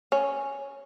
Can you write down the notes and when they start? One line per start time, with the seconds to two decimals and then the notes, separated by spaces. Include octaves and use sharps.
0.12 C#4